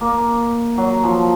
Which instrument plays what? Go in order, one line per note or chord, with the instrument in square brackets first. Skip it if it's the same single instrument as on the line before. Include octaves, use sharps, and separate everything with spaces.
[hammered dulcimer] A#3
F#3
F3